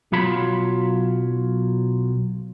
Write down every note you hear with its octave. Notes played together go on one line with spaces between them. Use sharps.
B1 F#3 F4 B5